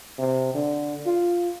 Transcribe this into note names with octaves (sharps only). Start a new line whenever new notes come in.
C3
D3
F4